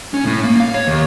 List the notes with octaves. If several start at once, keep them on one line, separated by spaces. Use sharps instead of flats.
C#4
A2
A#3
F5
C#5
D#2